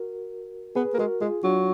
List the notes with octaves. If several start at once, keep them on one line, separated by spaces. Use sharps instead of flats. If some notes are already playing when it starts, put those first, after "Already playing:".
Already playing: F#4 A#4
B3 G#4 B4
A#3
G#3 F#4 A#4
G#3 F4 G#4
F#3 D4 F4